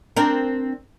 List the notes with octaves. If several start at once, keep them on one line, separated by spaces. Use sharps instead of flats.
C4 D4 A#4